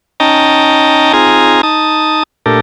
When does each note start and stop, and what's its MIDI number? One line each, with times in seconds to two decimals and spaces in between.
0.20 1.13 61
0.20 1.13 63
0.20 1.13 75
0.20 1.13 79
0.20 1.13 81
0.20 1.13 82
1.13 1.61 60
1.13 1.61 63
1.13 1.61 65
1.13 1.61 68
1.13 1.61 80
1.13 1.61 82
1.63 2.23 63
1.63 2.23 81
1.63 2.23 87
2.46 2.60 46
2.46 2.60 57
2.46 2.60 62
2.46 2.60 67
2.46 2.60 69
2.46 2.60 70